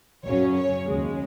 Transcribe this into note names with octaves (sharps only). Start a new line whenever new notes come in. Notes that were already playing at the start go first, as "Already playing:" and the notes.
F#2 C#3 F#3 C#4 C#5
C#5
D#2 C#3 G#3